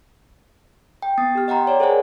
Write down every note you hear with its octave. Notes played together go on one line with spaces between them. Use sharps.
G5
B3 D#6 A6 C7
G4 F6
D#5 F#5 G5 A#5 C6
C#5 D5
G#4 A#4 C5 C#5 F#5 G#5